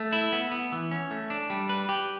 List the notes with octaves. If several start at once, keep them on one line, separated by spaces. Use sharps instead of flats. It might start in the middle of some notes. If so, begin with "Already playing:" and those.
Already playing: A3
E4
B3
B3
E3
C#4
A3
D4
G3
B4
G4